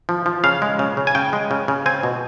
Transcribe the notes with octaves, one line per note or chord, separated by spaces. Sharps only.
F3
F3
C#3 F5
G#3
C#3
C#3
G#5
C#3 G5
G#3
C#3
C#3
C4 G#5
B2